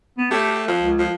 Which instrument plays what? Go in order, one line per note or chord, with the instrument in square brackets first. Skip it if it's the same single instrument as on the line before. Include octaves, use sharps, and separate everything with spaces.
[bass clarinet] B3
[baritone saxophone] A3 [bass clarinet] G4
[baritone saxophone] F3
[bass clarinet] C#2
[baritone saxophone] F3